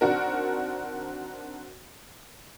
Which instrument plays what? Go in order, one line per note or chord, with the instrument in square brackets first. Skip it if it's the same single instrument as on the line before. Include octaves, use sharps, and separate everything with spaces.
[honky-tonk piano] D#3 C4 D4 F#4 A#4